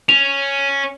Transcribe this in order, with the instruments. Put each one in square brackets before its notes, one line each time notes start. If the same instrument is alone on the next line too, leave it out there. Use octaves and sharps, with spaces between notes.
[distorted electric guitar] C#4 [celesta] F7